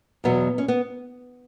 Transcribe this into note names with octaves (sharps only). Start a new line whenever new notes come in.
E2 B2 F#3 B3
C#4
B3